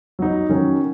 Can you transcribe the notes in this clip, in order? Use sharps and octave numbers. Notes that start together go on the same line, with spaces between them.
F#3 D#4
D#3 F#3 C#4